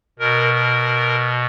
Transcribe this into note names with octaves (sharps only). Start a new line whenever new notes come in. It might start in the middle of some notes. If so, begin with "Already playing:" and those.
B2 A#4
A#4